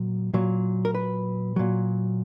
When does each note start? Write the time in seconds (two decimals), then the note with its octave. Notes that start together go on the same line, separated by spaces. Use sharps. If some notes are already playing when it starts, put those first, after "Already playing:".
Already playing: A#2 F#3
0.34 A#2 F#3
0.85 A#4
0.95 B4
1.56 A#2 F#3